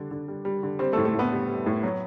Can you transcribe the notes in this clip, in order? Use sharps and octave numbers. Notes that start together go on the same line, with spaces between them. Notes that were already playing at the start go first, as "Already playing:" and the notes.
Already playing: D3 G3 D4
D3
G3
G3
D3
G3 C4 C5
A3 A4
A2
A3 A4
A2 B3 B4
G3
G3
A2
F#3